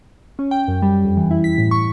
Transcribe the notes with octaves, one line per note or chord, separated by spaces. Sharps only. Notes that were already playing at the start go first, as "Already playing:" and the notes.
C#4
G5
F#2
G3
F2
E3
E4
B6
A2
C#6